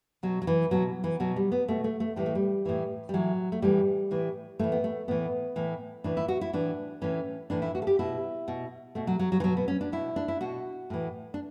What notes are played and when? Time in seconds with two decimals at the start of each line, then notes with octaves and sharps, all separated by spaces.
0.23 B2 F#3
0.42 F#3
0.47 E3
0.71 B2 F#3
1.04 E3
1.20 B2 F#3
1.36 G3
1.52 B3
1.68 B2 A3
1.84 A3
2.00 A3
2.16 A2 E3 G3
2.26 A3
2.35 G3
2.66 A2 E3
3.09 G3
3.14 A2 E3 F#3
3.52 A3
3.62 A2 E3 G3
4.11 A2 E3
4.59 A2 E3 A3
4.72 B3
4.84 A3
5.08 A2 E3 B3
5.56 A2 E3
6.04 A2 E3 D4
6.17 E4
6.28 F#4
6.41 E4
6.53 A2 E3 D4
7.02 A2 E3 C#4
7.50 A2 E3 D4
7.62 E4
7.75 F#4
7.82 A4
7.87 G4
7.99 B2 E4
8.48 B2
8.95 B2 A3
9.07 F#3
9.19 F#3
9.32 F#3
9.40 E3
9.44 B2 F#3
9.57 B3
9.68 C#4
9.81 D4
9.92 B2 E4
10.16 D4
10.28 E4
10.41 B2 F#4
10.90 A2 E3
11.34 D4